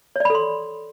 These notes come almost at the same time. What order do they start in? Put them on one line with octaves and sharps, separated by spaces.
C#5 D5 B5 A4 C6